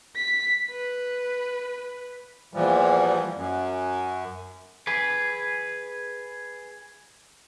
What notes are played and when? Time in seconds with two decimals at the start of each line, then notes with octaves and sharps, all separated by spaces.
0.16 B6
0.71 B4
2.54 E2 A#2 E3 F3 G3
3.35 F#2
4.87 G#4 B4